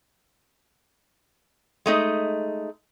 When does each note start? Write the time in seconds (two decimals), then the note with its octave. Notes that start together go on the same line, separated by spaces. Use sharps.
1.86 G#3 A3 D#4